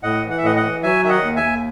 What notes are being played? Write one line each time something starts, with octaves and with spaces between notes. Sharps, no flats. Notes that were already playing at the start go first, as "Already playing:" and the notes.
A2 D#5 F#5
E3
F#5
E5
A2 D#5 F#5
D#5 F#5
E3
F#3 E5 G#5
D#3 E5
D#5 F#5
D#2
E5 G#5
D#2